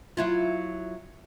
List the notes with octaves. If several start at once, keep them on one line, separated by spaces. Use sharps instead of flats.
F#3 E4 F4